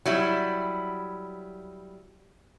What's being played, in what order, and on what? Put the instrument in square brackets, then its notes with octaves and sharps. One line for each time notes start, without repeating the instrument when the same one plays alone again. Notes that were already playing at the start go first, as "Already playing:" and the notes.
[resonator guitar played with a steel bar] F#3 G3 E4